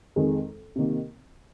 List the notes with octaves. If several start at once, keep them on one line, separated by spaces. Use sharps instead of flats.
F2 D#3 G#3
C3 D#3 A#3